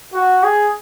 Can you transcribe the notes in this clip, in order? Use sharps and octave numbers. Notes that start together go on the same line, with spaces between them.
F#4
G#4